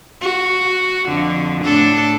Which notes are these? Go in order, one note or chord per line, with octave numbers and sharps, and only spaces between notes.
F#4
F2 D3
A2 D4 A4